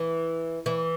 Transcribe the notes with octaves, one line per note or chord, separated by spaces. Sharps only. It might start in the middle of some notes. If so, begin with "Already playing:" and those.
Already playing: E3
E3